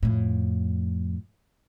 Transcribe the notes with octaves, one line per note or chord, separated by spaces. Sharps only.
F2 A2